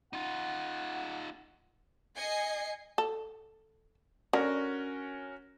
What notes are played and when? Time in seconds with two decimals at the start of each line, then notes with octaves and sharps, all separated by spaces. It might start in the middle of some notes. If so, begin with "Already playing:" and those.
0.13 D#4 F4 F#5
2.18 D#5 G#5 C7 C#7
2.98 A4
4.33 D3 C#4 F#4 A#4